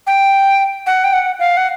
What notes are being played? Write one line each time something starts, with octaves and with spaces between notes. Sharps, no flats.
G5
F#5
G5
F#5
F5
F#5